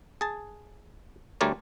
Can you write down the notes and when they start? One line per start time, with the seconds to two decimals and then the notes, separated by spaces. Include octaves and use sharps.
0.21 G#4 A5
1.41 D2 G3 A3 A#4 C#5 D5